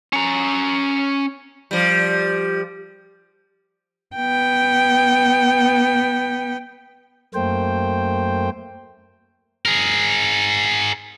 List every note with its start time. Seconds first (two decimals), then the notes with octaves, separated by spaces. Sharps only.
0.13 C#4 A#5
1.71 F3 G3
4.16 B3 G5
7.34 F#2 A3 A#3 C5 G5
9.65 G#4 A#4